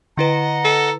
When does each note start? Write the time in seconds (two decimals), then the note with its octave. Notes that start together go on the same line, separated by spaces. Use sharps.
0.17 D3 E4 B4 D#5 F#5 A#5
0.64 A4